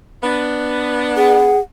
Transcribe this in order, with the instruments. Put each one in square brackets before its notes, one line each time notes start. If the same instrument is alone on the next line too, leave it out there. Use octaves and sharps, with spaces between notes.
[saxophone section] B3 D4
[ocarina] G#4 [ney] F#5